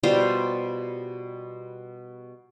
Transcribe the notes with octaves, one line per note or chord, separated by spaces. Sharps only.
B2 G3 F4 C5